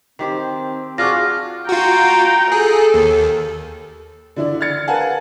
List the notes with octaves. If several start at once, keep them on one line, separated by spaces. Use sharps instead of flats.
D#3 C4 G4 C5
D4 F4 F#4 G#4 D6 F6 A#6
F4 F#4 G5 A#5
G#4 A4
D#2
D3 E4 D5
F6 G#6 A6 C#7
A#4 B4 F5 F#5 G#5 A5